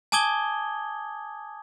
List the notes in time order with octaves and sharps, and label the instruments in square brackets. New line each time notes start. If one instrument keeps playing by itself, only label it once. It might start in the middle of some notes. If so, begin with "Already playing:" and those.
[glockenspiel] G#5 A5 D6 D#6 G#6 G7